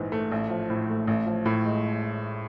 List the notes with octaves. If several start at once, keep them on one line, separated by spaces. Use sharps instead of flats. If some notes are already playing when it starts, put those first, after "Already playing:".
Already playing: A#1 G#2 E3
A3
A1
F3
A2
A3
A1
F3
A2
G#3